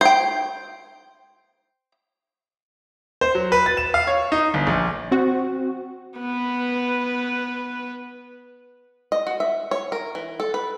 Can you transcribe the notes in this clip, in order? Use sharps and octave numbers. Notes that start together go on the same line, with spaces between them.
C5 G5
C5
F#3
B4
A6
E7
F5
C#5
D#4
G1
A#1
C4 F#4
B3 B4
D#5
F#4
E5
C#5
A#4
E3
A4
B4